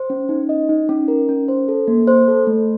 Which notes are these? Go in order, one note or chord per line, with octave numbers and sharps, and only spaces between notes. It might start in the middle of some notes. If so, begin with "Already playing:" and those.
Already playing: C5
C#4
D#4
D#5
D#4
C#4
A#4
C#4
C5
A4
A#3
C5
A4
A3